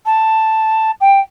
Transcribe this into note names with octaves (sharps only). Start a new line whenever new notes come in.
A5
G5